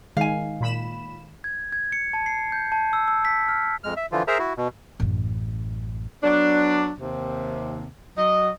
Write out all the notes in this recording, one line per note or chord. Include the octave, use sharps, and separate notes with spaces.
D#3 G#3 F5 G#5
A#2 B5 E7
G#6
G#6
C#7
A5
C7
G6
A5
E6
E6
B6
F6
F2 G#3 F6
E5
D3 E3 F3 F4
G#4 A#4 C5 E5 A#5
E4 F#4
B2
A1 F#2
F#3 B3 D4
D#2 C3
F#3 D#5